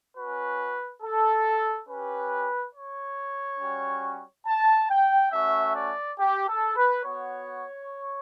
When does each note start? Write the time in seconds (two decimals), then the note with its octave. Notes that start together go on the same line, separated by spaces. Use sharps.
0.15 C#4 F#4 B4
1.01 A4
1.88 C#4 G4 B4
2.74 C#5
3.60 G3 C#4 F#4
4.46 A5
4.89 G5
5.32 A3 C#4 F#4 E5
5.75 D5
6.18 G4
6.47 A4
6.75 B4
7.04 B3 F#4 C#5